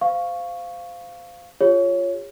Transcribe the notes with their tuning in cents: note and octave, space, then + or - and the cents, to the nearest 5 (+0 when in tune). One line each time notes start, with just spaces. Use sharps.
C5 -30 F5 +0 C#6 +0
F4 +0 G#4 -45 C#5 +0